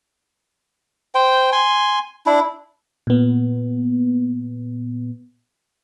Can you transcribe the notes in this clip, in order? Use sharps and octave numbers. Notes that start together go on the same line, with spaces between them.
C5 G5
G#5 C6
D4 E4
A#2 B3